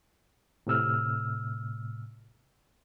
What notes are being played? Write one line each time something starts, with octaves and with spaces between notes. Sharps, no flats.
A2 C3 E6 F6